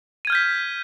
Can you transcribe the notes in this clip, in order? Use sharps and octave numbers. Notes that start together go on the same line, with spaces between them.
F6 G6 G#6 B6 D#7